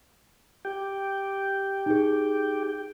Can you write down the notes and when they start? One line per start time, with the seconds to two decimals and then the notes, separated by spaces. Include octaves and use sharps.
0.65 G4 G5
1.86 D#4 G#4